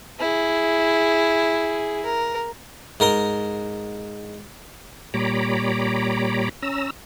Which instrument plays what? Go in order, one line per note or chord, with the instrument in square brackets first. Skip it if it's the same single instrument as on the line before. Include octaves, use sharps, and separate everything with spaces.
[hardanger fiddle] E4 G#4
A#4
[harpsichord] G#2 A#4 A#5 C6
[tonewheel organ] A#2 G3 C#5 A#5 B5 D6
C#4 A#5 E6